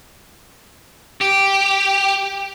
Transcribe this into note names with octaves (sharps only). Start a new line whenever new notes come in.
G4